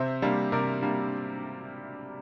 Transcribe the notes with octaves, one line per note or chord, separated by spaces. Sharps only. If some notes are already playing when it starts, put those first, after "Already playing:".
Already playing: C3 C5 E5
G3 A#3 D4
C3 A#4 D5
G3 A#3 D4